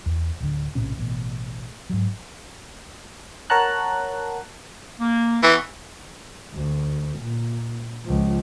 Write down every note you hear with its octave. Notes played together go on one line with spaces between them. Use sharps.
E2
D1 D3
A#1 A2 C3 C#4
A1 B2
G#2 F#3
A#4 C#5 F#5 A5 A#5 F#6
A#3
E3 B3 C#6
D2
A#2
C#2 F3